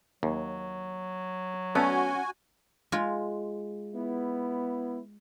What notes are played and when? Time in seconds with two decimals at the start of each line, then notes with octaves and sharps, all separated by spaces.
0.23 D#2 F#3
1.75 A3 B3 C#4 F#4 G#5
2.92 G#3 F4
3.95 B3 E4